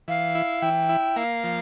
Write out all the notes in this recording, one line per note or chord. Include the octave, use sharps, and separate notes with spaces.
E3 F5
E4
E3 G5
E4
A#3 F5
F3